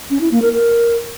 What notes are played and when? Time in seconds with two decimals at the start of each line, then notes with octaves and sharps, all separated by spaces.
0.10 C#4
0.21 E4
0.31 A#3
0.42 A#4
0.53 A#4